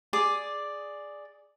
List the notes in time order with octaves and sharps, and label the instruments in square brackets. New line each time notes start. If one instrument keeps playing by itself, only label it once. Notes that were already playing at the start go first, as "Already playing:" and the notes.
[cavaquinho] G#4 D5 D6